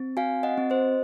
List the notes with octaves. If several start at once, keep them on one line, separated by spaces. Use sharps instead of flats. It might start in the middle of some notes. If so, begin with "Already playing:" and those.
Already playing: C4
F#4 F5 G#5
D#5 F#5
C4
C5 D#5